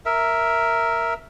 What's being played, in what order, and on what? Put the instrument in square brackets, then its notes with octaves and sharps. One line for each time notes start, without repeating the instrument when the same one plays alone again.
[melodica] A#4 E5